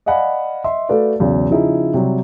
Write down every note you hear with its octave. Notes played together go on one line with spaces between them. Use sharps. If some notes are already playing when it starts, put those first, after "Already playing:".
D5 D#5 F5 F#5 G#5 B5
D#5 E5 C6
A3 F#4 A4 B4 D5 F5
B1 E2 C#3
C#3 F3 D#4 E4 G#4
C3 F#3 G3